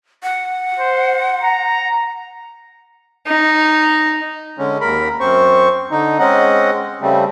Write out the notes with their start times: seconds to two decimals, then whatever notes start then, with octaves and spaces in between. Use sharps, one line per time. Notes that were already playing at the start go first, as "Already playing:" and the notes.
0.23 F#5
0.80 C5
1.42 A#5
3.27 D#4
4.58 D3 G#3 C#4
4.81 D#2 A#4 B5
5.20 F#2 C4 C5 C#6
5.91 D3 D#4
6.19 G#3 C4 C#4 D#5 F#5
7.01 C#3 G3 A3 C4